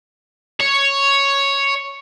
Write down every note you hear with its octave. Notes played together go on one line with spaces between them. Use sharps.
C#5